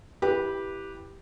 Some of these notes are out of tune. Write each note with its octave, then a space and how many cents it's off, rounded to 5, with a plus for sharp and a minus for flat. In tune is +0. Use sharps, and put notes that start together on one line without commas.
E4 +0 G4 +0 B4 -15